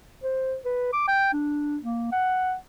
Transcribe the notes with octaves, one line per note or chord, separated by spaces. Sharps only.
C5
B4
D6
G5
D4
A#3
F#5